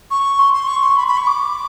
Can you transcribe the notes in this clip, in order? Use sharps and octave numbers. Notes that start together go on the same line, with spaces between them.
C#6
C6
C6
C#6
C6
B5
B5
C#6
D6